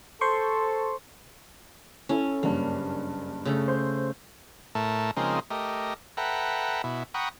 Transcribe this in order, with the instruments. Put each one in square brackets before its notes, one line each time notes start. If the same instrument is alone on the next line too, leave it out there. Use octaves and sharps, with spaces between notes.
[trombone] A4 [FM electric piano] C5 C6 C#6
[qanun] C#4 [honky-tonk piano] E4 A4
[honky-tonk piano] F#1 G2 [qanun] A#3
[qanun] C#3 A3
[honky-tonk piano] C5
[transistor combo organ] A2 A3 A#4 A5
C#3 F3 G#3 A#3 C4 D#4
A3 G4 A#4 D#5
A4 B4 E5 F#5 G5 A#5
B2 E4
F#5 G5 A#5 B5 C#6 D#6